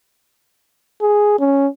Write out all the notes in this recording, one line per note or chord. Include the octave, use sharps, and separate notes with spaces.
G#4
C#4